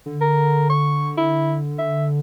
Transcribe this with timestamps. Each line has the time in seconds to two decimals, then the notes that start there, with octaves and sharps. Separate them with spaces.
0.06 D3
0.21 A#4
0.70 C#6
1.17 E4
1.79 E5